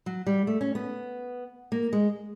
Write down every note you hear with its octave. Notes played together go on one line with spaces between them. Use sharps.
F#3
G3
A3
C#4
B3
A#3
G#3